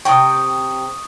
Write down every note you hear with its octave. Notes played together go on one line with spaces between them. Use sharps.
C3 G5 C#6 D#6